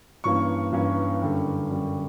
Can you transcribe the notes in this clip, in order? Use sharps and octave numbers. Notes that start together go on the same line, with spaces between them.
G2 E3 A#3 C#4 C#6
G2 E3 A#3 C#4
F#2 D3 G3
F#2 D3 G3